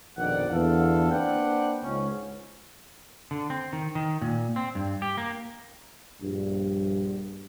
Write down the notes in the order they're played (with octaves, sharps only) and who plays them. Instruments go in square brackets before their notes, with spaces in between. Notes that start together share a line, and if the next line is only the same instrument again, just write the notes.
[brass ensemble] A#1 F2 B2 D#3 D5 F#5
E2 D3 B3 E4 A4 F5
A#3 C4 D4 B4 F#5 G5
C#2 G#2 C#4
[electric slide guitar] D3
C4
D#3
D#3
A#2
C4
G2
G4
A#3
[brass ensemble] A#1 G2